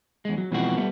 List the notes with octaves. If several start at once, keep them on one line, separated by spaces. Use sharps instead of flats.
E2 G#3
F#3
B2 E3 F3 G#3 C4 F#4
G3 A3 B3